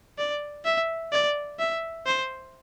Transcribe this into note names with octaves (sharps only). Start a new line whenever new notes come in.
D5
E5
D5
E5
C5